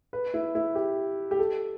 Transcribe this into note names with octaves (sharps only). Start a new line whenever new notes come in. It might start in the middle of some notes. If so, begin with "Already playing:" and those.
B4
E4
E4
G4
G4
A4